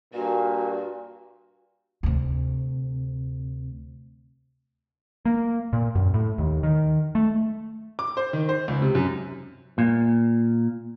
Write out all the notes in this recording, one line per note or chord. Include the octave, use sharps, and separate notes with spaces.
G2 A#2 F#4
D2 C3
A#3
A#2
F#2
A2
D#2
D#3
A3
D6
C5
D#3
C5
C#2
C3
F#2
A#2